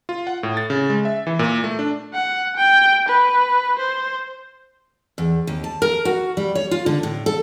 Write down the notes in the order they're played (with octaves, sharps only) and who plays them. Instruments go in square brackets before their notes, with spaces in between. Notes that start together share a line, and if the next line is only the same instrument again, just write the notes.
[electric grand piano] F4
F#5
A2
A6
C#3
G#3
E5
E3
A#2
A3
D4
[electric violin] F#5
G5
B4
C5
[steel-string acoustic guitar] E2
D#2
A5
A#4
F#4
G3
C#5
F4
D3
A2
A4